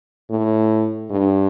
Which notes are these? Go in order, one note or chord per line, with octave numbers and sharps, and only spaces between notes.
A2
G2